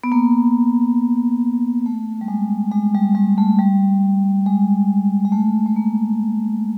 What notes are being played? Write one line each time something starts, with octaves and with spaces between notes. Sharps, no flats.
B3
A#3
A3
G3
G#3
G#3
G3
G3
A3
G3
G#3
G#3
A3
A3
A#3